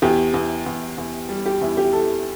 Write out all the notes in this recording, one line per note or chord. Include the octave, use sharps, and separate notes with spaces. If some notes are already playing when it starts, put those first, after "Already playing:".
E2 G4
E2
E2
E2
G3
G4
E2 E4
G4
E3 A4